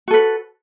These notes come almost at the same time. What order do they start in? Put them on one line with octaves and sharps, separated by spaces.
F#4 A4 B4